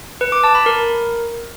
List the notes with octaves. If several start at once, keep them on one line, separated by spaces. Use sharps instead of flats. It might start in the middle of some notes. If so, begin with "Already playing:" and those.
B4
D6
A5
B5
A#4